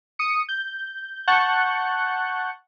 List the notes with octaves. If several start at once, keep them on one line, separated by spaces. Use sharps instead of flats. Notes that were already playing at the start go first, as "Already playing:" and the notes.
D#6 C#7
G6
F#5 A5 C#6 F#6 G6 C#7